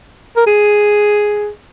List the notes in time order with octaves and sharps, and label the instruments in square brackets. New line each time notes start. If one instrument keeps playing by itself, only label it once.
[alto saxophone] A#4
G#4